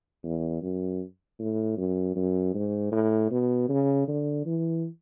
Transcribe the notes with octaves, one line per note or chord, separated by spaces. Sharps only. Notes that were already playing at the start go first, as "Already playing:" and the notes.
E2
F#2
A2
F#2
F#2
G#2
A2
B2
C#3
D3
E3